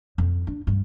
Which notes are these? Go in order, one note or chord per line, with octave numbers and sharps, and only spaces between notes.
F2
D4
G2